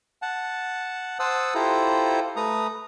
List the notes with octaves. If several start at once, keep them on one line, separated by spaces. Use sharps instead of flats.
F#5 A5
C5 F#5 A5 D#6 E6
E4 F4 G4 A4 C5 A#5
A3 B4 A#5 D#6